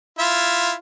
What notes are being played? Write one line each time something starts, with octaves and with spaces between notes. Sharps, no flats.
E4 F4 E5